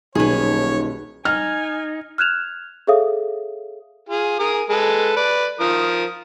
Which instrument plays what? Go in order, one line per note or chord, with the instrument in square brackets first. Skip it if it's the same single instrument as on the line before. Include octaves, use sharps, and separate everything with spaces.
[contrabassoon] D#1 [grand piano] B1 [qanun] G#4 B4 [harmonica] C#5
[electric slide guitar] D#4 [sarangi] G#5 [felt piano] F6
[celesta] F6 F#6 G#6 E7 F7
G#4 A4 C#5 E5 F5 D#6
[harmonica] F4 G#4
G#4 A#4 D#6
G#3 A4 B4
B4 D5
F3 A#4 D#6